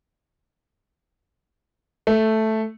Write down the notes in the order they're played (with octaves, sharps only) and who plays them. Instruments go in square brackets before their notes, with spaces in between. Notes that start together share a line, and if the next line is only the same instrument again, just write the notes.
[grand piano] A3